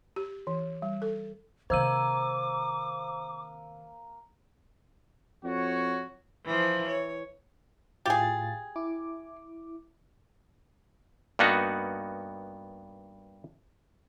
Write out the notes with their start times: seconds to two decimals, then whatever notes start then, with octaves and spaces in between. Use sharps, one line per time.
0.16 G4
0.47 E3
0.82 G3
1.02 A4
1.70 C3 D#3 A#3 C5 D6 E6 D#7
5.44 F2 F#4 C#5
6.45 E3 F3
6.88 C#5
8.06 A2 F4 G4 G#4 A6
8.76 E4 D6
11.39 G2 A#3 B3 D#4 F#4